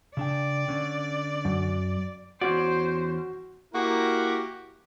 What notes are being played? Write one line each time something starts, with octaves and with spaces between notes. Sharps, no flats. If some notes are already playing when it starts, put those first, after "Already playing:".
C#3 D4 D5 G5
D3 C#4
F#2
E2 C#4 F#4 C5 D5
A#3 E4 F#4 G4 A#4